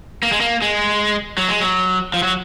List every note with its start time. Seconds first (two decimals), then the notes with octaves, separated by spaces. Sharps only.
0.23 A#3
0.32 G#3
0.41 A#3
0.62 G#3
1.38 F#3
1.49 G#3
1.60 F#3
2.14 F3
2.23 F#3